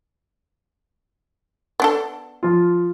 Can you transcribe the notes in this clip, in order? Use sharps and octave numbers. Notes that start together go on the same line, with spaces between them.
B3 D4 A4
F3 F4